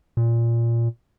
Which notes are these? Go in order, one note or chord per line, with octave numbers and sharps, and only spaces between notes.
A#2